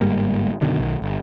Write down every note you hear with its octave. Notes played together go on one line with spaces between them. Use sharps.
G1 G#2 G3 A#3
F#2 B2 D3 D#3
B1 D#3
G1